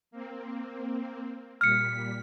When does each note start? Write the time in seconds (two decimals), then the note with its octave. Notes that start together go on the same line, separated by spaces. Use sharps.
0.11 A#3 C4
1.61 A#2 G3 F6 B6 C#7